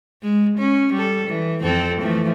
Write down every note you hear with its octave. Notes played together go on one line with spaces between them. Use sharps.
G#3
C#4
G3 A4
E3
F2 C4 A4
E3 F3 A3